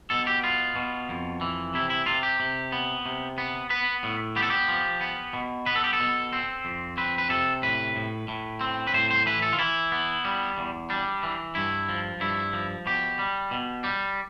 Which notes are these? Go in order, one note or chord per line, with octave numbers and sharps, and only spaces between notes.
B2 A4
G4
B3 F4
B2
F2
E3
C3 E4
E4
C3 F4
G4
C3
B3
C3
B3
B3 B4
A2
B3 G4
A4
G4
F3
B3
B2
B3 B4
A4
G4
A4
B2
C4
F2
C4 B4
B4
C3 A4
A2 B4
A2
A2
C4
B4
A2 C5
C5
E3 B4
A4
F4
E3 E4
B3
G3
E2
G3 D4
E3
G2 E4
F3
G2 E4
F3
B2 G4
G3
B2
G3